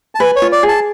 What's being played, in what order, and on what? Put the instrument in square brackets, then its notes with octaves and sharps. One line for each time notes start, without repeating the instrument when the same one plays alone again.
[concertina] A5
[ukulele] B4 [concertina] G#5
[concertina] C#5
[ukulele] F4
[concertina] D5
[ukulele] G#4
[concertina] A5